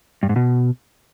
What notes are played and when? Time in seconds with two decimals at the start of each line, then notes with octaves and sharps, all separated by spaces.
0.23 G2
0.29 G#2
0.36 B2